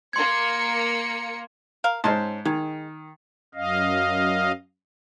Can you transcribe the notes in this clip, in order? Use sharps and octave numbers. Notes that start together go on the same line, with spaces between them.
A#3 C6 G#6 C#7
A#4 F5
G#2 C#4 C5 A5
D#3 G#3
F#2 D#5 F5